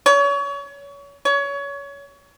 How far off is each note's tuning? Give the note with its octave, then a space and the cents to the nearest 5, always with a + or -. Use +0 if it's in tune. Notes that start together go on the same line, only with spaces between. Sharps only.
C#5 +30
C#5 +25